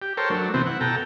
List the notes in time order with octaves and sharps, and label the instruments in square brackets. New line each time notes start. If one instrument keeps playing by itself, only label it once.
[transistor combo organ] G4
A4 A#4 C5 C#5 G5
F#3 A3 D4
C3 E3 B3 C4
E4 F#5
B2 A4 G5 A#5